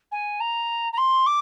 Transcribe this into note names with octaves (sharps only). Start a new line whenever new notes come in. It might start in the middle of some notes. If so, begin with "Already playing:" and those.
G#5
A#5
A#5
C6
D6